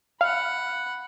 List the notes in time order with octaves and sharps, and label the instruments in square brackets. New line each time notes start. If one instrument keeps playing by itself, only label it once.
[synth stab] F5 [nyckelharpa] F#5 B5